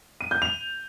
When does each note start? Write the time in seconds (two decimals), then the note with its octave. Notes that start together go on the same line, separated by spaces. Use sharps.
0.21 D#7
0.31 G6
0.42 F7